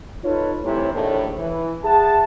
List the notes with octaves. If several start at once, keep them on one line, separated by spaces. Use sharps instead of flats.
D#4 F4 A4 B4 C#5
C2 A2 C3 E3 E4 C#5
A#1 D#2 A2
E3
G#4 E5 F#5 A5